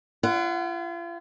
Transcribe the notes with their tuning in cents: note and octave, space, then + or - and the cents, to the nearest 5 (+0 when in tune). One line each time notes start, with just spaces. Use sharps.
F4 -40 F#5 +0